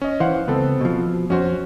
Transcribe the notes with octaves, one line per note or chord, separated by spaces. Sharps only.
C#4 D#5
E3 C5 F5 F#5
C#2 B3 C4 A4
B2 F3
F2 C#4 F#4 C5